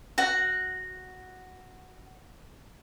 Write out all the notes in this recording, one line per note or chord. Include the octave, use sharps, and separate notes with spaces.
F#4 F#5